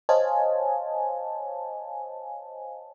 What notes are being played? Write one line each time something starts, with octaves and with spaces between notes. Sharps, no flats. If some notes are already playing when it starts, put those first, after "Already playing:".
C5 C#5 D#5 F5 G#5 A5